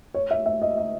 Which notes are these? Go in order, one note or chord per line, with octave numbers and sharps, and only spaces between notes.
C#5
E5
E5
D#5
D#5